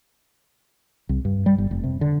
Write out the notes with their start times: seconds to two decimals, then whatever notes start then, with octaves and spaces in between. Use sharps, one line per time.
1.09 C2
1.25 G2
1.46 G3
1.58 G1
1.71 F1
1.84 C3
2.01 D3